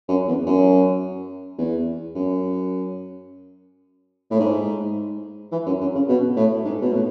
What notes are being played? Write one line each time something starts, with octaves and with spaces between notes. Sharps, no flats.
F#2
E2
F#2
E2
F#2
A2
G#2
E3
F#2
F#2
C#3
B2
A2
G#2
B2
A2